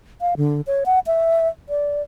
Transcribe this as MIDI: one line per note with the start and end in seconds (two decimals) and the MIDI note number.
0.21 0.34 77
0.37 0.61 50
0.67 0.84 73
0.86 0.99 78
1.07 1.48 76
1.69 2.02 74